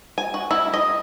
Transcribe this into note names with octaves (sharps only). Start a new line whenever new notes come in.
G#5
F#4
E4
D#5